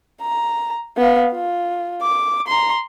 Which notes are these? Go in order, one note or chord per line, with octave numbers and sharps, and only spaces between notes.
A#5
B3 F5
F4
D6
A#5 C6